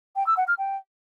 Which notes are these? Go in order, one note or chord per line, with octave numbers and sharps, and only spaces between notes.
G5
E6
F#5
F6
G5